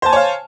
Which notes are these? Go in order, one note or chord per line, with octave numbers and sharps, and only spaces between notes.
C5 C#5 F5 G#5 A5